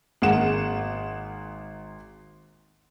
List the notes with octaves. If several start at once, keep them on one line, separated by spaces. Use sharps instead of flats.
G#1 A#3 G#4 F#5 E7